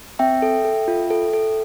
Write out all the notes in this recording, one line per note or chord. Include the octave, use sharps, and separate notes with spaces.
C4 E5 G5
A4
A4
F4
A4
A4